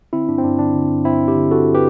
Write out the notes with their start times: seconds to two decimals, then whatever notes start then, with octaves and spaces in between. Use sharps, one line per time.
0.13 D3 C4 E4
0.28 G2 D4
0.38 C4
0.43 G2 D4
0.59 D3 D4
0.74 D3
0.90 G2
1.05 G2 C4 E4
1.21 D3
1.28 E4 G4
1.36 D3
1.51 G2 F#4 A4
1.74 G4 B4